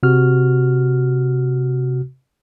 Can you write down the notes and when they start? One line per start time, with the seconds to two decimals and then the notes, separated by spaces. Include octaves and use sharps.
0.03 C3 F#4 F6